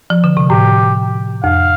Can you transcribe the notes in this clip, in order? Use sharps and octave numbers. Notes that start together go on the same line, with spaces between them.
F3
D3
C3
A2 G4
F2 F5